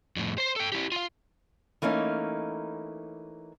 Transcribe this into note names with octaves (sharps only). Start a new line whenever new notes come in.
F2 A2
C5 C6
A4 G5
E4 G4
F4 F5
E3 A3 A#3 C#4 D#4